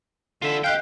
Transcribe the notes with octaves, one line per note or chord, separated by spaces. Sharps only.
D3 F4 E5
G4 D#5 F5 G5 F#6 G6